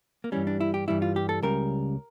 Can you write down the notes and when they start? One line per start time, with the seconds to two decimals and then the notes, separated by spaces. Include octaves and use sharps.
0.24 A#3
0.32 G2 E3 G3 C#4
0.47 D4
0.60 E4
0.74 G4
0.88 G2 E3 G3 E4
1.02 F4
1.16 G4
1.29 A4
1.43 C#2 C#3 G3 A#4